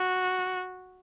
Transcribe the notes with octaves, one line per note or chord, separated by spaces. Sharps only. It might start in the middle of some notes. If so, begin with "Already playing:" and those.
Already playing: F#4